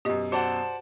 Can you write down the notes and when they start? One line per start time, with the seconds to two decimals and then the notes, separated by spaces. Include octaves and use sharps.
0.05 F#2 B2 G4 D#5
0.32 F#4 C5 D5 F#5 A5